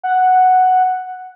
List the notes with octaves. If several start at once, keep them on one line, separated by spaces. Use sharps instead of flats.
F#5